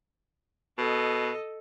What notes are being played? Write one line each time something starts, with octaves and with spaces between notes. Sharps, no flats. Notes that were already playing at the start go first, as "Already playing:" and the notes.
B2 A4 D#5